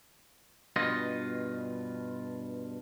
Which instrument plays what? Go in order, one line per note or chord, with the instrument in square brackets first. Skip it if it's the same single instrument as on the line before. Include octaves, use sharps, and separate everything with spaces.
[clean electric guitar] G2 B2 F4 D#5